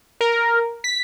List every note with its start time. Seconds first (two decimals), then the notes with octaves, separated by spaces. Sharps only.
0.21 A#4
0.84 B6